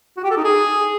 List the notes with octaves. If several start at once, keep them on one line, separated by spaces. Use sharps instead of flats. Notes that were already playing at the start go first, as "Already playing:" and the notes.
F#4
G4
A4
D#4
G#4